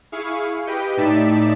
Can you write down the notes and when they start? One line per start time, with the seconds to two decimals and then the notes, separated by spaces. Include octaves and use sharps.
0.12 E4 G#4 F5 C#6
0.67 G4 B4 D#5 G5
0.97 A2 D#4 D5 E5 A5 B6